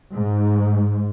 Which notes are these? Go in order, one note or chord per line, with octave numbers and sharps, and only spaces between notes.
G#2